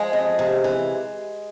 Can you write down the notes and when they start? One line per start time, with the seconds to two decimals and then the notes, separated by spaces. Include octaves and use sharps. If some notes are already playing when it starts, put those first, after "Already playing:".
Already playing: F3 G#3 G#4
0.13 F2
0.39 C3
0.64 E3